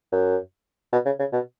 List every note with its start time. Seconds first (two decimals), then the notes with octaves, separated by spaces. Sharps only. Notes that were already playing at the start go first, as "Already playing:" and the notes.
0.12 F#2
0.92 B2
1.05 C#3
1.19 C#3
1.33 B2